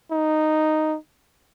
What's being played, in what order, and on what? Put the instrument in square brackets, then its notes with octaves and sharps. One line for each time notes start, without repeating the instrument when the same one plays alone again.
[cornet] D#4